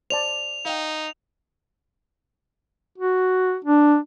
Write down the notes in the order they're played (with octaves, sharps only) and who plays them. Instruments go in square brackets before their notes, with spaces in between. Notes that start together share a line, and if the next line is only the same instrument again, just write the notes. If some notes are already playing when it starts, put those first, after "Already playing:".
[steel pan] C5 D5 A5 [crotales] F7
[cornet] D#4 [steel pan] F5 G5
[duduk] F#4
D4